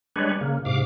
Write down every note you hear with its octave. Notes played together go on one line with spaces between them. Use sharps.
G3 G#3 D4 B4 C#5
C#3 A#3
G#2 C3 F5 D6